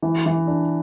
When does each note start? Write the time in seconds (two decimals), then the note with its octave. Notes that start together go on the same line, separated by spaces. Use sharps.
0.02 E3
0.26 E3
0.47 D4